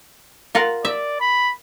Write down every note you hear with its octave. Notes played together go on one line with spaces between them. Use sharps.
F4 A#4 F#5
D5 E5
B5